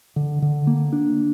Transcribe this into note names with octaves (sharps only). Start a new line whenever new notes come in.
D3
D3
A#3
D4